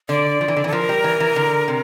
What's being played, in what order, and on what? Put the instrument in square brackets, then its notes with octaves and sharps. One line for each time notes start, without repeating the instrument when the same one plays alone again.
[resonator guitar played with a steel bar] D3 [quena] D5
[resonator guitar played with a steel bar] F3
E3
D3
E3
[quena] A4
[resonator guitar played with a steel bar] F3 [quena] A#4
[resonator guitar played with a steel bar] G3
E3
E3
D3
C3